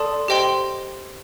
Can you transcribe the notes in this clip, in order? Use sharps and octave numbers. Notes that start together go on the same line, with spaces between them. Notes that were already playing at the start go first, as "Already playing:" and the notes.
Already playing: A4 D5 A5 C6 D#6
G4 C5 D#5 G5 C6